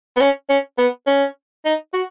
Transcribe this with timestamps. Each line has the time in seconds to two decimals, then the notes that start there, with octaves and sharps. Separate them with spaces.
0.17 B3
0.21 C#4
0.50 C#4
0.78 B3
1.07 C#4
1.65 D#4
1.93 F#4